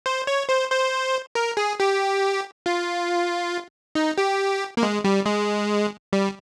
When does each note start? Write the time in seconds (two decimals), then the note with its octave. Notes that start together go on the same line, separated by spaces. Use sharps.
0.06 C5
0.27 C#5
0.49 C5
0.71 C5
1.35 A#4
1.57 G#4
1.80 G4
2.66 F4
3.95 D#4
4.18 G4
4.77 A#3
4.83 G#3
5.04 G3
5.26 G#3
6.13 G3